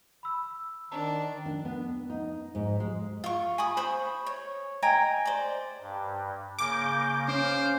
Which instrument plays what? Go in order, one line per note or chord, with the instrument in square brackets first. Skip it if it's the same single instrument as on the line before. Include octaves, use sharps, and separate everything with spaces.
[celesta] B5 E6
[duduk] D#3 [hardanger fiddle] D4 [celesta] A5 A#5
[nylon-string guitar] D4
B3
D#4
G#2
G#3
[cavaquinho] F4 C#6
G#5 B5 C#6 D#6
C5 B5 C#6
C#5
D#4 G5 G#5 A#5
C5 D5
[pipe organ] G2
[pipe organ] C#3 A#3 G6 [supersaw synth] D6
[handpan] C#4 [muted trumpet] C5 [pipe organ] F5